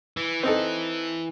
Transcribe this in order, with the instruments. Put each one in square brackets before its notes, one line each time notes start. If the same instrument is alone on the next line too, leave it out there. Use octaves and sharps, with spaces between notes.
[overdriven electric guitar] E3
[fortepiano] C4 D#4 A4